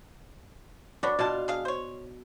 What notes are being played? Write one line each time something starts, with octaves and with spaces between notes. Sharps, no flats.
D4 F#4 B4 C#5
B2 D4 F4 A5
D4 G#4 F5
C5 C#5